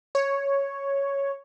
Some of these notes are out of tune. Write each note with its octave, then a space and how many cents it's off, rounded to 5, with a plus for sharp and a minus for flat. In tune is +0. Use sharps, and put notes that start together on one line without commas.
C#5 +0